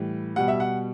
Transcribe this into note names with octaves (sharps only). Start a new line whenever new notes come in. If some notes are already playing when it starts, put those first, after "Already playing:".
Already playing: A2 E3 G3
B2 G3 F#5
E5
F#5